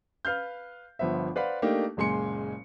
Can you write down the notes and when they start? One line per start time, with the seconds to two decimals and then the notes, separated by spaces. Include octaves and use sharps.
0.25 B4 F5 F6 G6
0.99 G1 F3 B3 C5 E5
1.36 B4 C5 D5 F5 F#5 B5
1.62 A3 A#3 D4 D#4 G4
1.97 F#1 A#2 G#3 G#5 C6 C#7